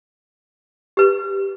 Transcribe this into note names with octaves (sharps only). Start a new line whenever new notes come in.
G4 B4